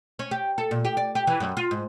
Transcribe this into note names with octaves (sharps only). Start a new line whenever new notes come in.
C#4
G4
A4
A#2
G4
D5
G4
E3
F#2
F4
G#2